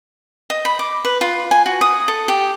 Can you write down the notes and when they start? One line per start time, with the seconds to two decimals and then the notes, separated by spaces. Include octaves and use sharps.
0.50 D#5
0.65 B5
0.79 D6
1.05 B4
1.21 F4
1.51 G#5
1.66 F#4
1.81 D#6
2.08 A4
2.28 G4